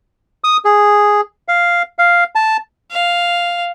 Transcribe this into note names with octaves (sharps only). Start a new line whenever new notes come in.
D#6
G#4
F5
F5
A5
F5